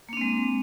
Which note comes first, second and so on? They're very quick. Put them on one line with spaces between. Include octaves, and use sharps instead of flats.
A#3 D4 C4 G#3